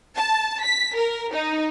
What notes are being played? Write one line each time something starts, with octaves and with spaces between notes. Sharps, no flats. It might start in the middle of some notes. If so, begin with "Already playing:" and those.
A5
B6
A#4
D#4